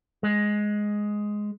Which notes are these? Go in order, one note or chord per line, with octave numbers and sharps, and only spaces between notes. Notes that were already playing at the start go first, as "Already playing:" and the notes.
G#3